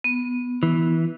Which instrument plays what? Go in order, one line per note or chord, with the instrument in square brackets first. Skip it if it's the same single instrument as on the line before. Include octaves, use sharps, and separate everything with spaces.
[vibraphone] B3
[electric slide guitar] E3